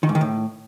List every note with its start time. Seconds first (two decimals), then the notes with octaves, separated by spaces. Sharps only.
0.03 D#3
0.09 G#2
0.15 D#3
0.21 A2